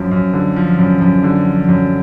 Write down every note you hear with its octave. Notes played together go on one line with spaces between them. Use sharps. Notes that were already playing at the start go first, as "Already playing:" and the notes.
Already playing: F#2 F3
F#2
D3
F3
F#2
F#2
D3
F3
F#2